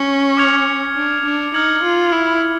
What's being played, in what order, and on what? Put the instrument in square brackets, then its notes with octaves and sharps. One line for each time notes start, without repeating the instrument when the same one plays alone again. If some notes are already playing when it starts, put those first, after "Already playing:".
Already playing: [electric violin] C#4
[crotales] D6 F6 G#6 C#7 F7
[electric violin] D4
D4
[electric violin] D#4 [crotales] F6 G#6 C#7 F#7
[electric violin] F4
E4